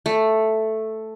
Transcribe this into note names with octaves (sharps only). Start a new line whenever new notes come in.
A3